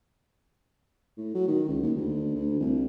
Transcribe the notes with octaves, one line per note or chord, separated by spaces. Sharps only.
A2
F#3
D#3
C#2
D#2
D2
D2
C2